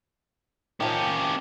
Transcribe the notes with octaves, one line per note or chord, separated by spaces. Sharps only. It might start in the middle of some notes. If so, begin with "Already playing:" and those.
D#3 F3 C#4 G4